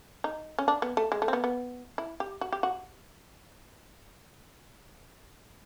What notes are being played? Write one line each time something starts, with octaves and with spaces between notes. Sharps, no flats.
D#4
C#4
D4
B3
A3
G#3
A3
C4
B3
B3
E4
G4
F#4
G4
F#4